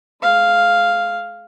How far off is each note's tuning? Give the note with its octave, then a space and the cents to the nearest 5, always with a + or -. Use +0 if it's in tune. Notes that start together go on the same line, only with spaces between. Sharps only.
G#3 +35 F5 +0